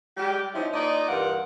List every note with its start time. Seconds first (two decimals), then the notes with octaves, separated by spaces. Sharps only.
0.17 G3 G#3 G4
0.54 F3 C4 C#4 D#4 E4
0.74 A#2 D#4 D5 D#5
1.08 G2 E3 F4 A#4 F#5